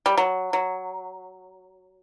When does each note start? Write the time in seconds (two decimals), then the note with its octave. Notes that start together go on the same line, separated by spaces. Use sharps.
0.06 G3
0.18 F#3
0.53 F#3